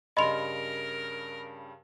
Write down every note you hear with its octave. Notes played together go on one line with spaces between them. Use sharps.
G2 C#3 G3 A#4 D#5 B5 C6 F7